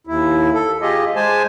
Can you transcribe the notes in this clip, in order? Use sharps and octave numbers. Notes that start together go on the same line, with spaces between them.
D#2 E4
A4
F4 G4 G#4 D#5
G#3 C5 G#5 A5